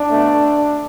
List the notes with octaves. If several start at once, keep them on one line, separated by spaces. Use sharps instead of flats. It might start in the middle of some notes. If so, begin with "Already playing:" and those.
Already playing: D4
B2 A3